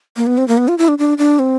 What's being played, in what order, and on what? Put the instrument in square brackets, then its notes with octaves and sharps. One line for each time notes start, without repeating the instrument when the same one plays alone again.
[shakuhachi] A#3
B3
C4
A#3
B3
F4
E4
D4
D4
D4
C4